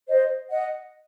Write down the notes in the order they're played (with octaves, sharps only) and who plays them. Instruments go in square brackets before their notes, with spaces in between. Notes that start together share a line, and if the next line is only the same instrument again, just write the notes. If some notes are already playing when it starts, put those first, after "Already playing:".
[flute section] C5 D#5
D#5 F#5